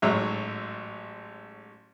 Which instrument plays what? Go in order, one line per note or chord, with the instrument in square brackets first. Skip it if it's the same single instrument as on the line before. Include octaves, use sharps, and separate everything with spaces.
[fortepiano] A1 G#2 F#3 E5